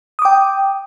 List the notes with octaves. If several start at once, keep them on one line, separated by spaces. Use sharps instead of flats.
G5 D6 D#6